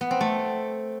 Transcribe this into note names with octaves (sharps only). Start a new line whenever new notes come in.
B3
C4
A3